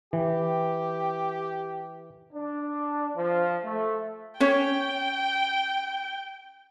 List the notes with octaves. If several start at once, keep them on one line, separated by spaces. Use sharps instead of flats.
E3 G4
D4
F3
A3
C#4 C#5 G5